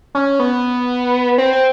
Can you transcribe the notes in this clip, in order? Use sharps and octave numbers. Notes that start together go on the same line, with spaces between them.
C#4
B3
C4
C4